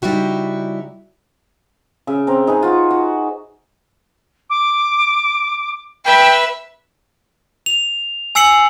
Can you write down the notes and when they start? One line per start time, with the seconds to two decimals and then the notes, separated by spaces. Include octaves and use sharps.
0.02 C#3 G3 D#4 E4 F#4 G4
2.07 C#3 E5
2.27 C4 A#5
2.47 D#4 G#4 B4
2.63 F4 F#4
2.90 F#4
4.49 D6
6.04 B4 E5 G5
7.66 F7
8.35 G#5 E6 C7 C#7 F#7